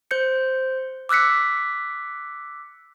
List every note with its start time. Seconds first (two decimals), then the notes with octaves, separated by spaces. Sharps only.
0.11 C5 G6 C#7
1.09 D6 E6 F#6 B6 C#7